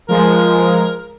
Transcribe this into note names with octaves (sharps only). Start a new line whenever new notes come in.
F3 G#3 A#4